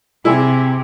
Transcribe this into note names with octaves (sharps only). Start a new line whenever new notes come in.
C3 E4 G#4